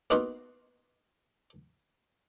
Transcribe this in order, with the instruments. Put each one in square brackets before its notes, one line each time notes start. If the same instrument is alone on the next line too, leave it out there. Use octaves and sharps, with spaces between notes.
[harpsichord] A#3 B3 D#4 F4 F#4